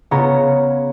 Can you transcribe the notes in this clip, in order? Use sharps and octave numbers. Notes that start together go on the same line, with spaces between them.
C#3 B3 F4 C#5 A#5